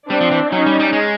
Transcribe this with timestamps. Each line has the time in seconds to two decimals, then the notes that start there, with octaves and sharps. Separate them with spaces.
0.10 G3 C4 D4
0.21 F3
0.31 E3
0.51 F#3 C#4 D#4
0.66 G3
0.80 G3
0.93 G#3